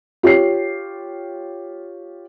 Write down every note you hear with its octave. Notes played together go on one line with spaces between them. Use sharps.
F4 G4 C#5 C7